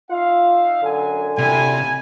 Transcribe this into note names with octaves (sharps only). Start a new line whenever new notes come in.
D#4 F4 E5 F5
F#2 D3 G#5
C3 G3 C4 E4 G#5